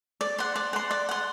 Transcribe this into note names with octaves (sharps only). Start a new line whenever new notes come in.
D5
F#5 C6
D5
F#5 C6
D5
F#5 C6